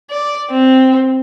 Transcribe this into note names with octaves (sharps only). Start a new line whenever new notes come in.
D5
C4